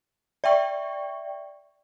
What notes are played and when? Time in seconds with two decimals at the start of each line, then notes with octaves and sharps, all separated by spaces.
0.44 D5 E5 G5 C#6